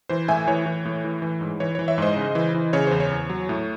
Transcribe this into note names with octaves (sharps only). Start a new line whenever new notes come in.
E3 C5
A2 E5 G#5
E3 C#5
E3
A2
E3
E3
G#2
E3 C#5
E3 C#5
C#5 E5
G#2 C5 D#5
C#3
E3
E3
C#3 C#5
E2 C5
C#5
E2
F#3
A2